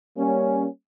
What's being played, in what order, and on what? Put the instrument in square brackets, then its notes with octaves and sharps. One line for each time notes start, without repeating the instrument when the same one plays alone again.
[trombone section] G3 A#3 C#4